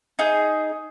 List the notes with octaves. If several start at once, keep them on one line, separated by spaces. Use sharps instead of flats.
D#4 G#4